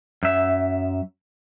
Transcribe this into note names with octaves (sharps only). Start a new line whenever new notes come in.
F#2 E5